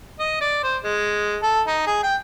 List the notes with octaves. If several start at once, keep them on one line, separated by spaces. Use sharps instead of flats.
D#5
D5
C5
G#3
A4
D#4
G#4
G5